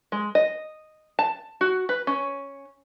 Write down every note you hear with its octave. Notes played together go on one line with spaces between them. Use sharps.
G#3
D#5
A5
F#4
B4
C#4